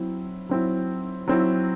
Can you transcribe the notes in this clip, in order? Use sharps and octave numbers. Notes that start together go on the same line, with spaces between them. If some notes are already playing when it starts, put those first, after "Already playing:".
Already playing: F#3 C4 E4
F#3 C4 E4
F#3 C4 E4